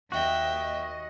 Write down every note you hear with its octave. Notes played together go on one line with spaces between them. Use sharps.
D#2 F#4 D#5 E5 G5